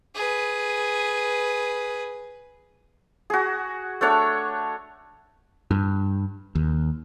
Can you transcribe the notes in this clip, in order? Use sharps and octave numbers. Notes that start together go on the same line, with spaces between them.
G#4 B4
F#4 G#4
A3 D4 C#5 F#5
G2
D#2